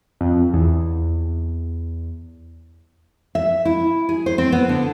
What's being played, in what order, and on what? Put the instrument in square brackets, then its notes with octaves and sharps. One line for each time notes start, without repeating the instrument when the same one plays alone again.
[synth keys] F2
E2
[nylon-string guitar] E5
E4
G#4
C5
C4
B3
D3